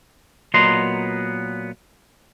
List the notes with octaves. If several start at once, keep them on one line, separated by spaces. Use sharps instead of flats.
A#2 F#3 B3 D#5 A#5 C6